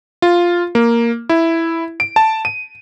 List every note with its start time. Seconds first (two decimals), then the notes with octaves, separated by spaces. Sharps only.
0.22 F4
0.75 A#3
1.29 E4
2.00 D7
2.16 A5
2.45 D#7